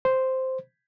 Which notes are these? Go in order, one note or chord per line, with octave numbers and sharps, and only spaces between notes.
C5